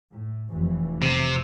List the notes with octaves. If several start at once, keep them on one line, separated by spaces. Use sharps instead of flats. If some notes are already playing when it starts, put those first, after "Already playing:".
A2
F1 E3
C3